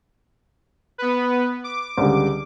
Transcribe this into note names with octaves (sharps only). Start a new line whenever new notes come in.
B3 B4
D6
C#2 D3 G3